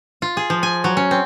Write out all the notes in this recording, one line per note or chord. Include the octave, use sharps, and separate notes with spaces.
F4
G#4
F3
G#5
F#3
C#4
C4